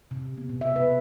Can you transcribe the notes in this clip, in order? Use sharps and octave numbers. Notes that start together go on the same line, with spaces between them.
C3
B3
B2
E5
B4